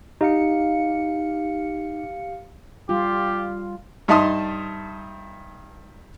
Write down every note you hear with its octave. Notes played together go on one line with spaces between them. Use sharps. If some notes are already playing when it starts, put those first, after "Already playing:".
D#4 G4 F5 C#7
G3 F4 G4
G2 D#4 E5 A5 C6 D#6